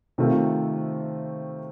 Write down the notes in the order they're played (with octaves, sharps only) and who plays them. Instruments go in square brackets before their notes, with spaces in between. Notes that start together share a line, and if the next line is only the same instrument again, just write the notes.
[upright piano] C3 D#3 A3 C4 F4